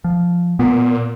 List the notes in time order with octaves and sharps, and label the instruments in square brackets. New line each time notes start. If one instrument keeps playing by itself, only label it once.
[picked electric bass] F3
[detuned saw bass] A#2 [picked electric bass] B3